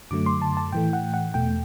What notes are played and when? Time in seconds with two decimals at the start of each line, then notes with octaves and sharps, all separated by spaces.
0.11 F#2 D3 F#3 A3 D6
0.26 C6
0.42 A5
0.57 A5
0.72 A2 E3 A3 G5
0.93 F#5
1.14 F#5
1.34 E2 B2 A3 G5